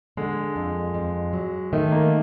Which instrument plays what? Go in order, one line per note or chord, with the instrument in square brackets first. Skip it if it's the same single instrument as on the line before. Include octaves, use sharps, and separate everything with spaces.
[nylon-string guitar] D3 [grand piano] G#3
[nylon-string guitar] F2
F2
F#3
[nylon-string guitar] D#3 [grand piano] A3
[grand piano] A#3